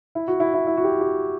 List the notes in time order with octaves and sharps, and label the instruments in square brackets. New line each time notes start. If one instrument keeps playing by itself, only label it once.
[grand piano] E4
F#4
E4
E4
E4
F#4
G4
G4